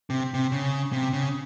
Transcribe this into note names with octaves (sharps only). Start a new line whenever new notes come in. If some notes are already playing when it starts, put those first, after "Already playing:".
C3
C3
C#3
C3
C#3